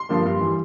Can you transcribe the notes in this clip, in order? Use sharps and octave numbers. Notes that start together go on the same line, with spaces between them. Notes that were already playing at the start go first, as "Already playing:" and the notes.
Already playing: C6
G2 D3 F3 A#3
G2
E3 G3